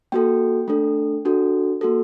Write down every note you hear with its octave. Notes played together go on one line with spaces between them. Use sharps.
A#3 F#4 A4 G5
A3 D4 A4
D4 F#4 A4
A#3 F#4 A4